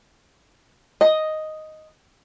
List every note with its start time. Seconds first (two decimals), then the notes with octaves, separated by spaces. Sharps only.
1.01 D#5